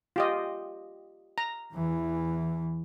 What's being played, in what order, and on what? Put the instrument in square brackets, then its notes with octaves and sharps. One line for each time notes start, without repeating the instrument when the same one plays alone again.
[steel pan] F4 G4 D#5
A#5
[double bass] E2 E3